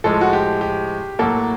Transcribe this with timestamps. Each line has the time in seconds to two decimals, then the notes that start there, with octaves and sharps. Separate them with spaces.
0.04 A2 F3 G#3 A4
0.21 F#4
0.33 G4
0.61 G4
1.19 A2 F#3 A#3 A4